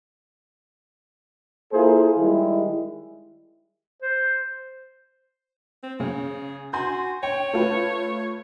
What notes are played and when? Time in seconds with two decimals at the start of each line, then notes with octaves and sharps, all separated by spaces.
1.73 A#3 E4 F4 G#4 A4 C5
2.18 D#3 G3 G#3 E4
4.02 C5
5.83 C4
6.00 C#3 G#4
6.73 F#4 G#5 C6 G6
7.23 C#5 G5
7.53 A3 F4 B4